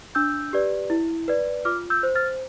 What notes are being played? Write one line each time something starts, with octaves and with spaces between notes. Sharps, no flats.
D4 E6 G6
G4 B4 D5
E4
B4 D5
F4 D6 F6
E6 G6
C5
F6 A6